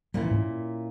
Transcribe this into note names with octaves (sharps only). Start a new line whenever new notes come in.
A#2 G3 A#3 C#4 E4
E3
G#2